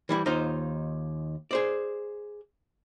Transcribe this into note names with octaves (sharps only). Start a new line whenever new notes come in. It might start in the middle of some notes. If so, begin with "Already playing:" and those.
E3 G3 E4
D#2 D#4 F4 C5
G#4 C5 D5